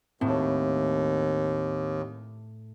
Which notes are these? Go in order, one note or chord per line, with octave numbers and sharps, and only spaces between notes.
D#2 A2 C4